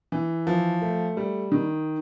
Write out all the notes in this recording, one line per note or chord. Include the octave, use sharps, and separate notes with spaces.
E3
F3
A3
G3
D#3